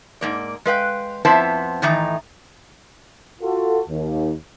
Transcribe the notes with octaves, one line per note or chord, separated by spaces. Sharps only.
G#2 A#3 D5
G#3 B4 F5 G5
F2 B3 C4 E4 C5 A5
A2 D#3 E3 D#4 A#5
F4 F#4 A4
D#2